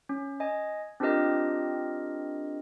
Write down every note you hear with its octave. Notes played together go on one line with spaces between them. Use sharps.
C#4
D#5 G#5
C4 D4 F4 G4 A#4 D#5